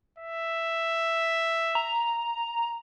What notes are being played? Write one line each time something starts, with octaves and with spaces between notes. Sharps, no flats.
E5
A#5